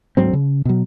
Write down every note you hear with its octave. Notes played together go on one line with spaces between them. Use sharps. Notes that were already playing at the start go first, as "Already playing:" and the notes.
D2 G#2 F#3 C4
C#3
B2 F#3